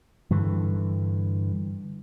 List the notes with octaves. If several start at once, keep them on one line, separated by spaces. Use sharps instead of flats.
G2 D3 E3